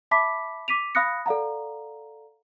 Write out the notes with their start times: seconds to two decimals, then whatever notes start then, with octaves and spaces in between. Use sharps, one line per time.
0.11 E5 A5 B5 D6 B6
0.68 D6 B6 D#7 F7
0.95 F5 B5 D#6 F#6 A#6 C#7
1.26 A4 D5 F5 F#5 A#5